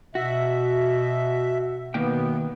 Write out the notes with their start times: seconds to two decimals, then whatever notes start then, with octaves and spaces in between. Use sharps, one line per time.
0.15 B2 F#4 E5
1.94 B2 D#3 A#3 B3 G5